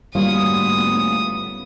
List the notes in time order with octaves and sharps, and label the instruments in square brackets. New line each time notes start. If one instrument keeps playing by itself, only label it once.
[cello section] D2 G#2 B3 [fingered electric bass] G3 [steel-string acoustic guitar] A#3 C#4 F4 [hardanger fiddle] D#6